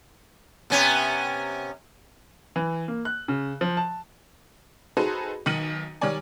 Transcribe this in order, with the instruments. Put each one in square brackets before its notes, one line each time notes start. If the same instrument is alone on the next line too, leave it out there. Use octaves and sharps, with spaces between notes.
[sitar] C3 B3 C#4
[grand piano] E3
A#3
F#6
C#3
F3
A5
[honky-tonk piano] D#4 F#4 G#4 A4 B4 C5
B1 D#3 C#7 D#7 F#7
D#3 G3 C#5 D5 G#5